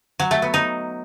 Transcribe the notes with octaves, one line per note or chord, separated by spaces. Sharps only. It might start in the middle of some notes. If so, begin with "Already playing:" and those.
F#3
A3
B3
D#4